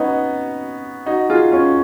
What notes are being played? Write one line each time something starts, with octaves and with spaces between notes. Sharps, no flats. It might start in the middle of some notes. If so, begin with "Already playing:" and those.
Already playing: B3 C#4 D#4
D#4 F#4
F4 G#4
C#4 F4